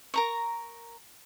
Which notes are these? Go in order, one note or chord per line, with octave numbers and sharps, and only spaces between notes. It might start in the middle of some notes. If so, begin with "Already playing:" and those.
A#4 A#5 C#6